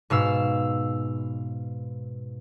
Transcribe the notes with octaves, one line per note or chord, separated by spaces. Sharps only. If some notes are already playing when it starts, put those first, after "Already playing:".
G#2 B2 F5 E6